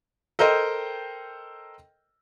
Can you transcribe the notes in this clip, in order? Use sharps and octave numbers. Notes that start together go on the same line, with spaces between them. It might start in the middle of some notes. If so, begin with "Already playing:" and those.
A4 A#4 C5 D#5 G5